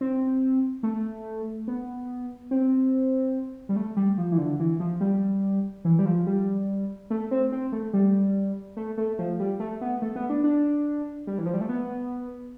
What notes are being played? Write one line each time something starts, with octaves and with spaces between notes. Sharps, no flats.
C4
A3
B3
C4
G3
A3
G3
F3
E3
D3
E3
F3
G3
E3
G3
F3
G3
A3
C4
C4
A3
G3
A3
A3
F3
G3
A3
B3
A3
B3
D4
D4
G3
E3
F3
G3
A3
B3